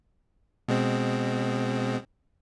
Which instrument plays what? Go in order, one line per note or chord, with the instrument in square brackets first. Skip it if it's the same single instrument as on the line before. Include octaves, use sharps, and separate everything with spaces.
[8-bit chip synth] B2 G#3 C4